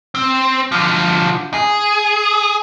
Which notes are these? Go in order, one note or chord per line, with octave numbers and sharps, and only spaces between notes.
C4
D3 F3
G#4